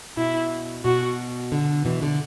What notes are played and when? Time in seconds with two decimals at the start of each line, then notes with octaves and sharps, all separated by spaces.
0.17 B2 E4
0.85 B2 F#4
1.52 D3
1.85 B2 E3
2.02 D3